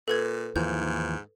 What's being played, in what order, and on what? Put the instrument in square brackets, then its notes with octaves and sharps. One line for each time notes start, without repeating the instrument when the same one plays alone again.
[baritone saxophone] A#2 [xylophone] A4 B4 G#6
[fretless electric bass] D#2 E3 F3 [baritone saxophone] G#2 [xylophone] G6